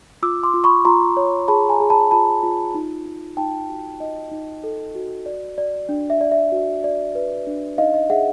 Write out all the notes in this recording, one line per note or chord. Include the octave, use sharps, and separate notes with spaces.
F4 D6 E6
C6 D6
F4
B5 C#6
F4 A#5 C6
C#5
G#4 A5 B5
G#5 A#5
G#4
A5 B5
F4 A5 B5
F4
D#4
D#4
D#4 G5 A5
F#4
D#4 D#5
D#4
A4
F#4
D5
D5
D4
E5
D5
E5
F#4
D5
B4
D4
D#4 D#5 F5
D#5 F5
G#4 E5 F#5